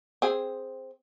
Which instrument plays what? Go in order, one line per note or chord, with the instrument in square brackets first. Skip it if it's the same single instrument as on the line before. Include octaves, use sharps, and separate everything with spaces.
[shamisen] C4 G#4